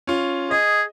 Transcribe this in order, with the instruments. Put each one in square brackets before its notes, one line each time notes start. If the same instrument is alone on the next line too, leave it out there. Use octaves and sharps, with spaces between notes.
[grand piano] C#4 F4
[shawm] G#4 [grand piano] D#5